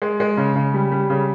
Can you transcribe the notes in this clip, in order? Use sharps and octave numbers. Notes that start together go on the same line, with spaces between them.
G#3
G#3
C#3
C#3
G3
G3
C#3